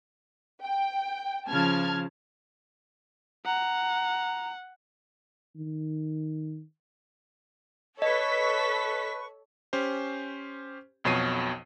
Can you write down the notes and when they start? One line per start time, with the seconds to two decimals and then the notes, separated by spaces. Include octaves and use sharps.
0.62 G5
1.48 C#3 F3 A5 F6 G#6
3.46 F#5 A#5
5.56 D#3
8.02 A4 B4 C#5 D#5 C#6 B6
9.73 C#4 G4 C5
11.04 B1 F2 B2 C#5 C7 D#7